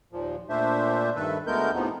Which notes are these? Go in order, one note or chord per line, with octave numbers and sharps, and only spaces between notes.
D#2 A#2 F3
A#2 A3 D4 C5 E5
G2 D#3 A4 B4 E5
D2 G#3 A3 B3 A#4 G6
A2 C3 F3 B3 C4 D#4